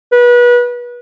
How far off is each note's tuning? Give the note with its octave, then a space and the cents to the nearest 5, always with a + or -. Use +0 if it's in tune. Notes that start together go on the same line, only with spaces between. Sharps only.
B4 -30